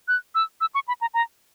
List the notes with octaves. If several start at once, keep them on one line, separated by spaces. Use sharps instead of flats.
F#6
E6
E6
C#6
B5
A#5
A#5